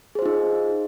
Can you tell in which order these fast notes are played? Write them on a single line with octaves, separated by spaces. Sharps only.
G#4 C5 F4 D#4